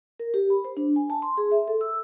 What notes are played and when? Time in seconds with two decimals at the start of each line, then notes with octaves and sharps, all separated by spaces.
0.20 A#4
0.34 G4
0.50 B5
0.65 C5
0.77 D4
0.96 G#5
1.10 A5
1.22 C6
1.37 G#4
1.51 E5
1.68 A4
1.81 E6